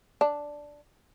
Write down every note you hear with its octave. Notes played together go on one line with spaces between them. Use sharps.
D4